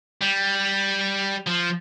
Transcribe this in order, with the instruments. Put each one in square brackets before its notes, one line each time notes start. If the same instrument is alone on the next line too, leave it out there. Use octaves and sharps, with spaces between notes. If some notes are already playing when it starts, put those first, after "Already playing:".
[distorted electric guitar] G3
F3